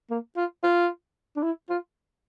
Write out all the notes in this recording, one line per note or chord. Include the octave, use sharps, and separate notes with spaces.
A#3
F4
F4
D4
E4
F4